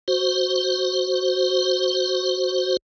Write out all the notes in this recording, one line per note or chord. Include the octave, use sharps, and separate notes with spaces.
F#4 C5